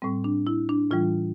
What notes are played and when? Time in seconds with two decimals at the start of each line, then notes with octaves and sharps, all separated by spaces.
0.02 A2 G3 C4
0.24 D4
0.47 E4
0.69 D4
0.91 A2 E3 G3 F4